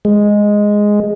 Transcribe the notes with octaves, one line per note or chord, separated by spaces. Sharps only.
G#3